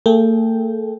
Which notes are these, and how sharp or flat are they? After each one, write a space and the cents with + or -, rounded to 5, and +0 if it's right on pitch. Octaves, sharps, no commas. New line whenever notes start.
A3 +45 A4 -40 G5 +0